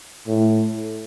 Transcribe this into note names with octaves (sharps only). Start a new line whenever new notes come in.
A2